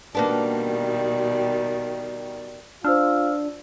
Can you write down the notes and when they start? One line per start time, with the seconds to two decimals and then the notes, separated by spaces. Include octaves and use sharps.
0.15 B2 D#3 G3 A#3 B3 D4
2.84 D4 F4 C5 E6 F6